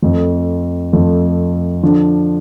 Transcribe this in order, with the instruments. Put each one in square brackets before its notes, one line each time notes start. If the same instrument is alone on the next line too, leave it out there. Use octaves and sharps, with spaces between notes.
[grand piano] F2 F3 A3
F2 F3 A3
D3 F3 D4